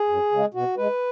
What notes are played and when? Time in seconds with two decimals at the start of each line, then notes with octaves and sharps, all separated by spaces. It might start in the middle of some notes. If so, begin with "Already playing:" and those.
Already playing: G#4
0.09 F#2
0.32 C#3 G#3
0.54 B2 F#4
0.77 G#3 B4